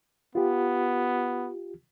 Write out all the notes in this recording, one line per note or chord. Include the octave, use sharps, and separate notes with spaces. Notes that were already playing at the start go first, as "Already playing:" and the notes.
B3 F4 G4